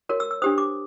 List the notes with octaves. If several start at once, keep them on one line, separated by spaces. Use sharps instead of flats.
F#4 A#4 C#5
E6
E6
D4 G4 C5 D#6
D6